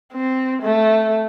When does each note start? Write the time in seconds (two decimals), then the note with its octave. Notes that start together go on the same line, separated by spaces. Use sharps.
0.13 C4
0.62 A3